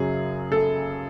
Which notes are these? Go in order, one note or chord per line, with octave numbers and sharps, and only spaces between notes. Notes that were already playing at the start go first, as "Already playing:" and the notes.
Already playing: F#2 C#3 F#3 G#4
A4